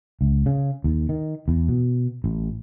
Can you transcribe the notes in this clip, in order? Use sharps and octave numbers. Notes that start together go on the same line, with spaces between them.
C#2
C#3
D#2
D#3
E2
B2
A1